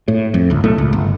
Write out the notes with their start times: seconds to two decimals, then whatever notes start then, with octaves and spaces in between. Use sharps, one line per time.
0.08 A2
0.34 F2
0.50 G1 C#2
0.64 B1 A2 A3
0.78 C#2
0.93 G1